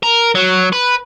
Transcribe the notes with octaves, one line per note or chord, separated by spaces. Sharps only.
A#4
F#3
B4